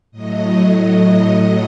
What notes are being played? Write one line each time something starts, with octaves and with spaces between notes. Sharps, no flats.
A2 F#3 D#5
D#5
D#5